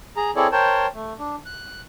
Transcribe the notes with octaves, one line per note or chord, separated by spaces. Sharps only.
G#4 A#5
C4 E4 G#4 A4 C#5 D5
A#4 C5 C#5 G5 A5
A3
D4
F#6